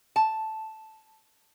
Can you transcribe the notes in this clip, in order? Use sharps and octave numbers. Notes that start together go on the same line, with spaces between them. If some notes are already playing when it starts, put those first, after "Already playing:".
A5